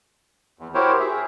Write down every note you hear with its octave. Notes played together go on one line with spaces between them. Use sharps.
E2
E4 F#4 G4 A#4 C5 C#5
G#4 E5